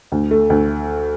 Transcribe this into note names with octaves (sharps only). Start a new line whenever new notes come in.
D2
A3
D2